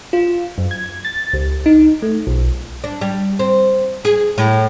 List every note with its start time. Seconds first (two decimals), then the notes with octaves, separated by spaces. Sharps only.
0.13 F4
0.58 F#2
0.71 G#6
1.05 A6
1.33 C#2
1.66 D#4
2.02 A3
2.27 B1
2.84 D4
3.01 G3
3.39 C4
4.05 G#4
4.38 A2